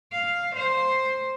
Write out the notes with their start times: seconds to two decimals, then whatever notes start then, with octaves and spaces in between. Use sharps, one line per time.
0.12 F5
0.55 C5